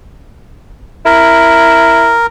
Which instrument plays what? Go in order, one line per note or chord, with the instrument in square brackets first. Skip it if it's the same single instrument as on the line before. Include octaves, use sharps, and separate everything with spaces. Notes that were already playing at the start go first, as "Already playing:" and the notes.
[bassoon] E4 [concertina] A#4